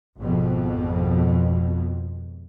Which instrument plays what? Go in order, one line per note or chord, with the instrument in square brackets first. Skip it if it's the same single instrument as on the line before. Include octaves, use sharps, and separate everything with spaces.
[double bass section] G#1 F2 B2